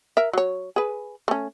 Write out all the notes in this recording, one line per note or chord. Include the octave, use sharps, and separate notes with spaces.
A#4 E5
F#3 C#5
G#4 B4
A3 C#4